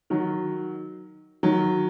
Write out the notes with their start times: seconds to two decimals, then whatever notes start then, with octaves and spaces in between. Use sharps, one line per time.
0.10 D#3 F#3
1.43 D#3 F#3